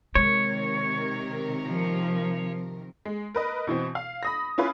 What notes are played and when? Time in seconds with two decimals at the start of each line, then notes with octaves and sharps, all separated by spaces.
0.15 C3 D#3 G#3 A#4 C#5
1.67 F3
3.06 G#3
3.35 A#4 B4 D#5
3.67 B2 E3 C4
3.95 F5
4.23 B5 D#6 A#6
4.58 C#4 E4 F4 B4